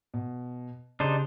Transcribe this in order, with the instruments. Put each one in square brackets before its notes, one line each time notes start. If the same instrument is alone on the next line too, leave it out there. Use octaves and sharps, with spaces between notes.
[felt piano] B2
[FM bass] C#3 [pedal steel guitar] D4 D#4 C5 [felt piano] G4 G#4